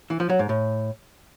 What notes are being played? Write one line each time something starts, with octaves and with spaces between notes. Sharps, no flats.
E3
F3
F#3
G#2
A2